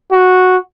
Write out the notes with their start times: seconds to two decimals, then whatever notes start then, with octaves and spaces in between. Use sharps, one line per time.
0.12 F#4